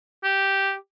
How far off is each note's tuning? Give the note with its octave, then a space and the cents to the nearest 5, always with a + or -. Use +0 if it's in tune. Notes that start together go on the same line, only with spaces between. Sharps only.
G4 -5